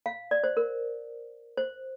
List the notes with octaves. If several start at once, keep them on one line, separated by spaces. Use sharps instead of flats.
F5
D5
C5
A#4
C5